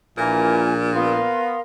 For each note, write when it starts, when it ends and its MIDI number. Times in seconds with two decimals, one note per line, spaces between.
0.18 1.23 34
0.18 1.30 46
0.18 0.64 52
0.18 0.64 64
0.18 0.64 70
0.18 0.72 80
0.94 1.55 59
0.94 1.61 70
0.94 1.61 77
0.94 1.61 84